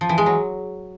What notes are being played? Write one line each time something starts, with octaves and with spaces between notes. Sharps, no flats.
F3
E3
G#3
F#3